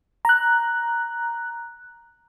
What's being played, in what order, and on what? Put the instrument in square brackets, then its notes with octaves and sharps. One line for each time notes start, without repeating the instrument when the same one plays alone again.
[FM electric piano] A#5 F#6